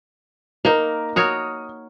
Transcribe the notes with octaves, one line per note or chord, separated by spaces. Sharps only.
A#3 D#4 A#4
F#4 A#4 C#5 D#6